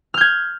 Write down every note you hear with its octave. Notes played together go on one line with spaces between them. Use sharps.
F6 G6 G#6